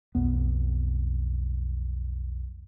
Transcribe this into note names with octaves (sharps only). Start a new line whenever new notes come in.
B1 F2 B3